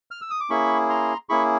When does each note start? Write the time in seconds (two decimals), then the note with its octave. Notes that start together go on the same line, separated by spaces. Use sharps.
0.11 F6
0.21 E6
0.30 D#6
0.40 D6
0.50 A#3 C#4 E4 G#4 B5 C#6
0.89 A#5 C6
1.29 A#3 C#4 E4 G#4 B5 C#6